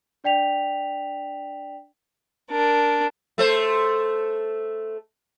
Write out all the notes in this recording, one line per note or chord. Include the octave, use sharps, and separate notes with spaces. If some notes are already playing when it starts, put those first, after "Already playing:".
D4 D5 G5 B6 F7
D4 A#4
A3 A4 C5